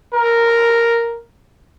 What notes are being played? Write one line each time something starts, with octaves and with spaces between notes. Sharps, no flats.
A#4